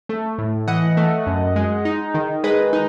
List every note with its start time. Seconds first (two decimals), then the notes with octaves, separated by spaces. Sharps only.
0.09 A3
0.38 A2
0.67 E3 D#5 F#5
0.97 A3
1.27 F#2
1.56 G#3
1.85 D#4
2.14 D#3
2.44 G#3 B4 D#5
2.73 D#4